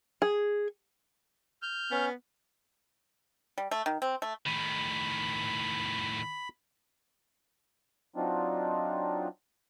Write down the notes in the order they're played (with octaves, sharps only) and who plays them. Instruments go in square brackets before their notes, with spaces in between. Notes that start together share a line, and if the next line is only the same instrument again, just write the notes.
[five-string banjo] G#4
[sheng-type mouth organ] F6 G6
[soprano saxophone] B3 [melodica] C#4
[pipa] G3
A3
D#3
C4
A3
[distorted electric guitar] A2 D#3 [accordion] B5
[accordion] F#3 C4 D4 D#4 F4